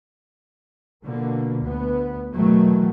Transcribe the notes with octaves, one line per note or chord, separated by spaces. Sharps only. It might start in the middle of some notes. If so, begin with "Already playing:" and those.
B2 D3 F3 A#3
D2 B3
E2 B2 D#3 F#3 A3